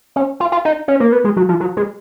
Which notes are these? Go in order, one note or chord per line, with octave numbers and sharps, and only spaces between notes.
C#4
F4
F4
D#4
C#4
A#3
B3
G#3
F#3
F3
F#3
G#3